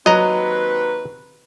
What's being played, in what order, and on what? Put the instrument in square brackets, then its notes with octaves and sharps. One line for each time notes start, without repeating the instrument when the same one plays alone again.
[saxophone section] D#2 C4 B4 [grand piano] F#3 [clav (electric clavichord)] D#5 A#5